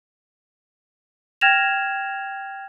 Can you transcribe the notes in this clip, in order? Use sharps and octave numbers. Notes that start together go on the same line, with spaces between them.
G5 F6 G#6 A#6 E7 F7